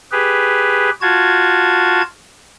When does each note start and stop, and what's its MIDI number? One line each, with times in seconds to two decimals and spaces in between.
0.12 0.90 67
0.12 0.90 68
0.12 0.90 71
1.01 2.02 65
1.01 2.02 66
1.01 2.02 81
1.01 2.02 92